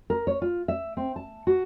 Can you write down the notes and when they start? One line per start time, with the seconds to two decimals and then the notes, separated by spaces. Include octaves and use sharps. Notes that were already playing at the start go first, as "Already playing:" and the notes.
0.10 A#4
0.27 C#5
0.42 F4
0.68 E5
0.97 C4
1.16 A5
1.47 F#4